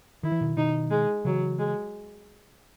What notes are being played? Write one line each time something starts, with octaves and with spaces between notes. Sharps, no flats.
D#3 E4
E3
B2 D#3
B2 D#3 D#4
G#3
C#3 E3 F#3
G#3